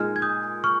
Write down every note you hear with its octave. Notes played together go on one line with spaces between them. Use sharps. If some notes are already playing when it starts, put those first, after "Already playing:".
Already playing: A#2 G#3 D#4 G#4 F6 G#6
G#6
D#6 G6
C#6 F6